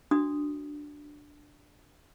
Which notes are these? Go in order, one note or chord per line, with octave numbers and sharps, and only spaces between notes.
D4 F#4 D#6